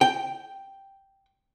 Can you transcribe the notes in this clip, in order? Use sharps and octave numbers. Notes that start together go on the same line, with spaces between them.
G5